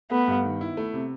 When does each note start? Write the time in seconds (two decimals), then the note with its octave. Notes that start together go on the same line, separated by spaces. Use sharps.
0.11 A3 B3
0.28 G2
0.44 D#3
0.61 E4
0.77 A3
0.94 C3